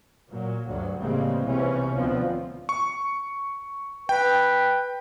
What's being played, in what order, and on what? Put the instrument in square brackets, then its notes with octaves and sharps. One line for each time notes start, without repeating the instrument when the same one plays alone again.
[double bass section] A#2 F#3
D2 G2 F#3
A1 C#3 G3 G#3 A#3 C4
B1 C3 E3 C#4
D2 B2 D3 F3 B3 C4
[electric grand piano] C#6
[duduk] B4 [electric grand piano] G5